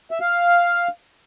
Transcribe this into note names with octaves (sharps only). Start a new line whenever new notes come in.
E5
F5